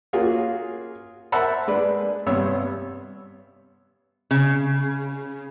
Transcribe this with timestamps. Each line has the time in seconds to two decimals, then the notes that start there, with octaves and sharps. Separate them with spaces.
0.13 A#3 C#4 F4 F#4 G#4 A#4
1.32 A#4 C5 E5 F#5 A5 B5
1.68 G#3 D4 B4
2.27 G2 C3 B3 C#4 C#5 E6
4.31 C#3